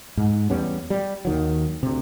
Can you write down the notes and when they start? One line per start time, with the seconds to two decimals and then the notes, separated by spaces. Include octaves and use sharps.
0.17 G#2
0.50 E2 G3 B3 C#4
0.90 G3
1.25 D#2 D#3 F#3
1.83 D2 C3